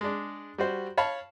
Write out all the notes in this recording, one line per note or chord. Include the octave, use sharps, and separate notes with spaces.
G#3 D4
G3 F#4 C5
C#5 F5 A5 B5